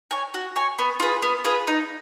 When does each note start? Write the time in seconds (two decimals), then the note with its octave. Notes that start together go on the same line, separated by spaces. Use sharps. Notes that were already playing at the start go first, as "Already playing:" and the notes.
0.11 C#5 G#5
0.34 F#4
0.56 C#5 G#5
0.79 B3
1.00 F4 G#4 B4
1.22 B3
1.44 F4 G#4 B4
1.67 D#4